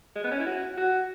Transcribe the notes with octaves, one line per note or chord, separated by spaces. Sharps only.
G#3
B3
C#4
E4
F#4
F#4